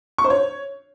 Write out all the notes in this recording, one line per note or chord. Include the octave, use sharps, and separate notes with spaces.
C#6
C5
C#5